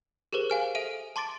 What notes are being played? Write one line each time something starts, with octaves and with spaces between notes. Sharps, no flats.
G4 G#4 A#4 C5
F5 G#5 F6
A4 E5 D7 D#7
A5 C6 D6 A6 D7